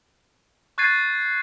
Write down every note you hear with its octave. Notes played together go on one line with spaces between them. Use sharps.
C#6 F#6 G#6 A6 C7 D#7